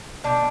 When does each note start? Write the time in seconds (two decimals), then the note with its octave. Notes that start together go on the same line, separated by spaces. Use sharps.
0.24 B2 G3 D4